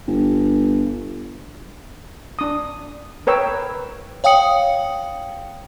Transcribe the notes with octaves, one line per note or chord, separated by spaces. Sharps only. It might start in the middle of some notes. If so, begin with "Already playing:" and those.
G1
D4 D#6
A#4 B4 C#5 G5 E6
C#5 F5 G5 D#6 C#7 F#7